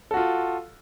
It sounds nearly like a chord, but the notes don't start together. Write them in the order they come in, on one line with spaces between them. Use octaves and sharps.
A4 F#4 F4